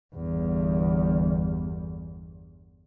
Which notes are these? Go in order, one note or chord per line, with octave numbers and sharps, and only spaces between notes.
G1 E2